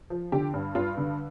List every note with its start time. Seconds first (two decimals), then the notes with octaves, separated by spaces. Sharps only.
0.10 F3
0.32 D3 G4
0.54 G2
0.75 G2 F4
0.97 D3